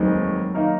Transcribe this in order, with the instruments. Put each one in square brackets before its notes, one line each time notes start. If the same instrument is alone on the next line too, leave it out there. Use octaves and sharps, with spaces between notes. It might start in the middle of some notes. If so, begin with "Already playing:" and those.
Already playing: [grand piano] F1 D#2 D#3 G#3 C4 [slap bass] F#3
[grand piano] D#3 A#3 D#4 A#4